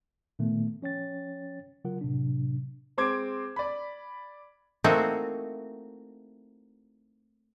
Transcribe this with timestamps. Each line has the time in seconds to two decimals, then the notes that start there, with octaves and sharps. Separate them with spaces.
0.39 A#2 D#3 A3 B3
0.82 F3 C#4 C#5 G5 A6
1.84 C#3 F#3 F4 A#4 F#5
2.01 A2 C3 F#3 D4
2.98 G#3 C4 C6 D6 G#6
3.56 D5 B5
4.84 A3 A#3 C4 D#4 E4 F#4